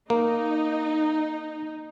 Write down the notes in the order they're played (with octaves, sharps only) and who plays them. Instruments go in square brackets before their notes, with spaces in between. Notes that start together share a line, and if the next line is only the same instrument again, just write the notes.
[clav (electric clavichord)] A#3 [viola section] D#4